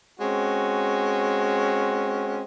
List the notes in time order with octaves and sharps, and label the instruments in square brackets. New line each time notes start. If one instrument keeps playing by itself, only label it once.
[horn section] G#3 C4 C#4 F#4